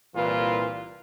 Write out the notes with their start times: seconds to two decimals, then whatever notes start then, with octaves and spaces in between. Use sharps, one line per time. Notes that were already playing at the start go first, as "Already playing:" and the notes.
0.16 C2 A#2 E3 F4 B4